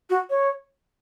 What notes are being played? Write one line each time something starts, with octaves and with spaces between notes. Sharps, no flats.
F#4
C#5